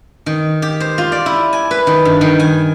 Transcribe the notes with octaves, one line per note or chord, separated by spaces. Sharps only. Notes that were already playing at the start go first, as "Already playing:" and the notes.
D#3
G4
C5
F4
D5
E4
G#5
B4
D#3
G2
D#3
G#5